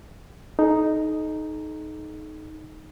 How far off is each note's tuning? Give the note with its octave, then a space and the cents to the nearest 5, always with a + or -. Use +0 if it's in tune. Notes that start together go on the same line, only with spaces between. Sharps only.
D#4 +0 A4 -45